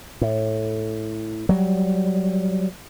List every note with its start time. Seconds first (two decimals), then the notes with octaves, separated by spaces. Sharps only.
0.21 A2
1.49 F#3 G3